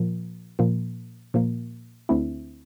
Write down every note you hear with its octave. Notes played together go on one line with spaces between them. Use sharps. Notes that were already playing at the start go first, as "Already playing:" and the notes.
Already playing: A#2 F3 A#3
A#2 F3 A#3
A#2 F3 A#3
D2 D3 A3 C4 E4